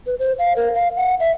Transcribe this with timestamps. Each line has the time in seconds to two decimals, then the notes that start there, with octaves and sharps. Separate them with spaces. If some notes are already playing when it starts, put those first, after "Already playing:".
0.07 B4
0.19 C5
0.39 F5
0.56 A#4
0.75 F5
0.96 F#5
1.20 E5